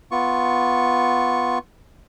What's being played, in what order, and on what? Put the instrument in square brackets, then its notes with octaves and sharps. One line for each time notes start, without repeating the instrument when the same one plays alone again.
[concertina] B3 F4 C#6